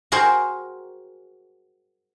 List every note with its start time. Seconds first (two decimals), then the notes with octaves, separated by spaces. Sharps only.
0.12 F#4 G#4 A#4 C5 G5